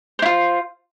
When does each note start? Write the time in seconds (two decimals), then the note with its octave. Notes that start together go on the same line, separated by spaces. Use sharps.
0.19 C5
0.22 E4
0.26 F4